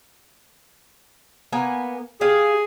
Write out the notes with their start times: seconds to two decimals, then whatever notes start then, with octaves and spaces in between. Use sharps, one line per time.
1.52 A#3 B3 G#5
2.21 G4 G#4 F5